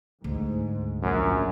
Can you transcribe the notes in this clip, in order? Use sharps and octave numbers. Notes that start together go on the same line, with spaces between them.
D2 G#2
A#1 F#2